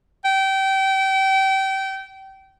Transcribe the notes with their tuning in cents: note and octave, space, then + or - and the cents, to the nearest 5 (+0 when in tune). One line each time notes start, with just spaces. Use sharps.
G5 -25